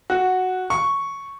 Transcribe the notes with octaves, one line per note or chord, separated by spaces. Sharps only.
F#4
C#6